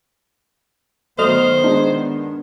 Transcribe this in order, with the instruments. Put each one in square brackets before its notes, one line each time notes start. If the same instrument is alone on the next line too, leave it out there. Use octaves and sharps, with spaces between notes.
[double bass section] D#3 B3 [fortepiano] F#3 D5 [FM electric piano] A3 D#5 F6 [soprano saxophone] C5
[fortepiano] G#3 D#4 [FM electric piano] D4